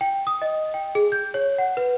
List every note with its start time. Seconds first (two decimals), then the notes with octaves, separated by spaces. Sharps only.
0.01 G5
0.27 D#6
0.42 D#5
0.74 G5
0.95 G#4
1.12 G6
1.34 C#5
1.58 F#5
1.77 B4